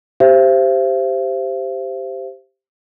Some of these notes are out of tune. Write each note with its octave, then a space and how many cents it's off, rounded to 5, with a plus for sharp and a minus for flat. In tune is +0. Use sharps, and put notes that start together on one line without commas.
G4 +0 C5 +0 E5 +45